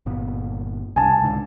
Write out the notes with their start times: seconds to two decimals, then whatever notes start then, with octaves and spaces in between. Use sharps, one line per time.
0.06 G1 A#2 B3
0.96 C2 C#3 G#5 A5
1.21 C#2 G#2 D3